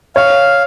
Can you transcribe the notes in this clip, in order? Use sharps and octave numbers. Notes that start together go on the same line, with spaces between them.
C#5 F5